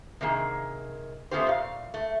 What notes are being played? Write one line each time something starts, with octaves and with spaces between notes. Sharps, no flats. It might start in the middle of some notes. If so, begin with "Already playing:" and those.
C3 D#3 A#3 G#4
A3 B3 C#4 F4 G4 C5
A#2 F5
A3